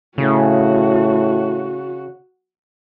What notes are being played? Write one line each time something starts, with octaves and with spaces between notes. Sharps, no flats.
A2 C#3 F#4